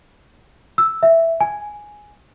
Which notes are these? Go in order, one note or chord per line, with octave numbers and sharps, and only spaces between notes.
E6
E5
G#5